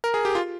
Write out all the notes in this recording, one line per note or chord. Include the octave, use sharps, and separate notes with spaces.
A#4
G#4
G4
F4